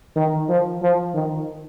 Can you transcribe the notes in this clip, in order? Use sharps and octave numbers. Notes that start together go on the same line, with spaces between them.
D#3
F3
F3
D#3